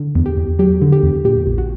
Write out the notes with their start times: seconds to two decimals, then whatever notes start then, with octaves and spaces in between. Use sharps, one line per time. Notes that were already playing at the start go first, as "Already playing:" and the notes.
Already playing: D3
0.15 E2
0.26 G4
0.37 E2
0.59 F#3 G4
0.82 D3
0.92 G4
1.03 E2
1.25 A#2 G4
1.47 A#1
1.58 F#4